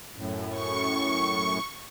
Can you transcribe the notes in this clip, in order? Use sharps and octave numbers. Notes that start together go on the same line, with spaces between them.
F#2 A2
C#6